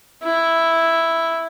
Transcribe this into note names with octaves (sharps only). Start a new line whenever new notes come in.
E4